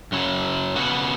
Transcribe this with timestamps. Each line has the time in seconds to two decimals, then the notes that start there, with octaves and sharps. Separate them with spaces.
0.12 F#2 C#3 F#3
0.76 C#3 B3 F#4